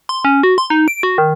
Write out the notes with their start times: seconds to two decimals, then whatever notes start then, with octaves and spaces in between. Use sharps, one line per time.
0.09 C6
0.25 C#4
0.43 F#4
0.58 C6
0.70 D#4
0.88 D7
1.03 F#4
1.18 D#3